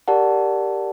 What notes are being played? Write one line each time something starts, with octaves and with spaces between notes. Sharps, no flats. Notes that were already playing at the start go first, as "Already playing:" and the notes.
G4 A#4 D5 F#5 A5